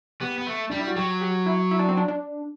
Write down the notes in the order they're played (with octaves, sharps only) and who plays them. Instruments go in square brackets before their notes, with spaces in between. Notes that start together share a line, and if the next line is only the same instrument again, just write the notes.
[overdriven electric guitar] B3 [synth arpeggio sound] G4
[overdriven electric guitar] B3
A3
[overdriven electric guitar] G3 [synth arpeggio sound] D4
[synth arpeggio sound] E4
F#4
[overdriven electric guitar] F#3 [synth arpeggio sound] G4
[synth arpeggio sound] G4
E4
E4
D4
C4
D4
D4